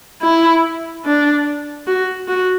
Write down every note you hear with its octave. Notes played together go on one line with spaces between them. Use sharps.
E4
D4
F#4
F#4